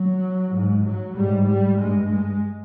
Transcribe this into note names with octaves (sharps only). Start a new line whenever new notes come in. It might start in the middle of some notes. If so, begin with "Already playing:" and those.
Already playing: F#3
G#2
F#3
G#2 G3
G3
G2 G#3
G#3